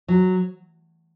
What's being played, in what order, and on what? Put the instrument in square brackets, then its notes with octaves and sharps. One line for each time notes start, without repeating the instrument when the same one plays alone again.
[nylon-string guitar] F#3